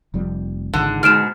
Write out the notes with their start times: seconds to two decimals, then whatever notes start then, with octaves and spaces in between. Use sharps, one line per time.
0.14 F1 F2 G3
0.74 G#1 C#2 G#2 D3
1.03 G#2 B2 D3 G#3 F6 D7 E7